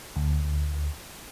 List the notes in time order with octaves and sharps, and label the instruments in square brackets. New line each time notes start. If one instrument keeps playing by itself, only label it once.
[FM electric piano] D2